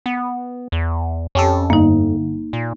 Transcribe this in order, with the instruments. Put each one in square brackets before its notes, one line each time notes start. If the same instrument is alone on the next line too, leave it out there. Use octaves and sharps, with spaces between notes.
[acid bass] B3
E2
[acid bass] F2 [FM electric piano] C#4 G4 A4
[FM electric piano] G1 [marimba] A#3 D#4
[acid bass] A#2